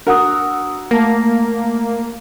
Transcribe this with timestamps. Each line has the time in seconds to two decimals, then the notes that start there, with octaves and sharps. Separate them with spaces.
0.07 D4 F#4 A#4 D#6 E6
0.91 A3 A#3 A5 A#6